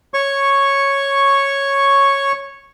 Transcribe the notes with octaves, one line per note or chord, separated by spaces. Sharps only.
C#5 C#6